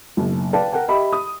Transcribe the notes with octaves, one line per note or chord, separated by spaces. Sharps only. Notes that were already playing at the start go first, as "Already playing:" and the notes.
F#1 B1
B4 D5 F5 G5 A5
A#4 F#5 G5 A5
G4 D#5 E5 B5
D#6